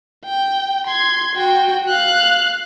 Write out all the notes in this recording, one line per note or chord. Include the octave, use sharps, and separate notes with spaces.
G5
C6 G#6
F#4 G5
F5 F#6